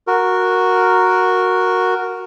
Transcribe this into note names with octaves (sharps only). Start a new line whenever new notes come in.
F#4 A#4